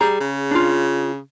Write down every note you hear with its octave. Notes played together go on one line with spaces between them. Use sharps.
G3 G#4 A#5
C#3
D4 F4